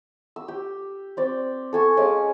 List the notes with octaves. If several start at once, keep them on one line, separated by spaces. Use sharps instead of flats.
E6
G4
C4 D5
A4 G#5 C#6
G#3 C#4 F5 D6